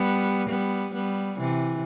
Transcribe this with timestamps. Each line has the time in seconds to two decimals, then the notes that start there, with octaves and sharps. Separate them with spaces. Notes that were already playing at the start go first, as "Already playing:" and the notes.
Already playing: G3 B3
0.49 G3 B3
0.94 G3 B3
1.39 C3 E3